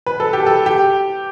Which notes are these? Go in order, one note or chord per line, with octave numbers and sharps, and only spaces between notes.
B4
A4
G4
A4
G4